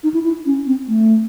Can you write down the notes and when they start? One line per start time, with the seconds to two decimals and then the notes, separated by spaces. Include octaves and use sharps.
0.03 D#4
0.14 E4
0.24 E4
0.46 C#4
0.67 C4
0.88 A3